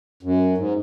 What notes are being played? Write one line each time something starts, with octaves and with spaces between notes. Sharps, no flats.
F#2
G#2